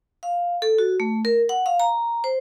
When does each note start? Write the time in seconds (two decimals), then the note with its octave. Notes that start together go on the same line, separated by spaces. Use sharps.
0.23 F5
0.62 A4
0.78 F#4
1.00 A3
1.25 A#4
1.49 F#5
1.66 F5
1.80 A#5
2.24 C5